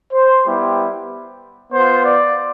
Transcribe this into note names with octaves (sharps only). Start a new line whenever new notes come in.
C5
G3 B3 E4 G4
B3 F4 C5
D5